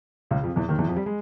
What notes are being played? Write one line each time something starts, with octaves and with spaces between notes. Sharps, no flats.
C#2 C#3
F2 F3
E2 E3
D#2 D#3
E2 E3
F2 F3
G3
G#3